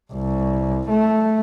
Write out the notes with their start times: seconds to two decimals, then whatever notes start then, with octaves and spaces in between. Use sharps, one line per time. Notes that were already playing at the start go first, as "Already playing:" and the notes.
0.13 C2
0.89 A3